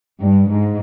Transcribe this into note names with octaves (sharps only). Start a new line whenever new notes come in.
G2
G#2